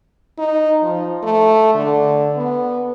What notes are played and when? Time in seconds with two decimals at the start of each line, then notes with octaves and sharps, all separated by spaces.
0.39 D#4
0.83 F3
1.23 A3
1.74 D3
2.37 B3